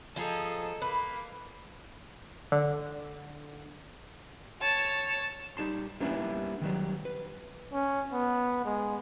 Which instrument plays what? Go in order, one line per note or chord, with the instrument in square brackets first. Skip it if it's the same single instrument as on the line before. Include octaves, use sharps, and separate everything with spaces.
[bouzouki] F3 G#4 A#5 [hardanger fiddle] A4 D#5
[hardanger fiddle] A#3 [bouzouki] B4
[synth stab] D3
[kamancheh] C#5 A5
[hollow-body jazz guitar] G3 D#4 A5 C6
G3 A#3 B3 C#4 D4 E4
D#3 F#3 G3
B4
[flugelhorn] C#4
B3
G#3